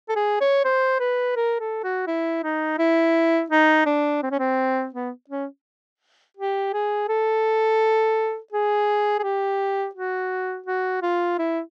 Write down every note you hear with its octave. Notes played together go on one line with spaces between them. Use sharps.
A4
G#4
C#5
C5
B4
A#4
A4
F#4
E4
D#4
E4
D#4
D4
C4
C#4
C4
B3
C#4
G4
G#4
A4
G#4
G#4
G4
F#4
F#4
F4
E4